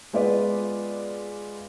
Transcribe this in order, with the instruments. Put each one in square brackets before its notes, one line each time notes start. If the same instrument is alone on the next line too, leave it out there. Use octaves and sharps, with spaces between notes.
[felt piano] G#3 B3 F4 B4 D5